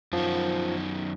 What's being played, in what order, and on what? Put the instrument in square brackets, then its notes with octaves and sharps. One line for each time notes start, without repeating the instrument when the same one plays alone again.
[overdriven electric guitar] F#2 D#3 [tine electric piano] F3